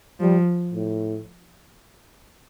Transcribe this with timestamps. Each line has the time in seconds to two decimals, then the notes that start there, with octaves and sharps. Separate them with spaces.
0.20 F3 G3
0.73 A2